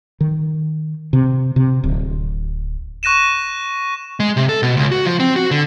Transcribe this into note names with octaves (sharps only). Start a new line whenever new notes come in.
D#3
C3
C3
D1
C#6 F#6 A#6 D#7 E7
G#3
C3
A4
B2
C#2
F#4
F3
C4
F#4
D3